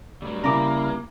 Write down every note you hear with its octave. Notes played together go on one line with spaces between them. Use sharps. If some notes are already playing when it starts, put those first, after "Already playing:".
A2 F#3 G3
C#3 A#3 E4 A#5 D6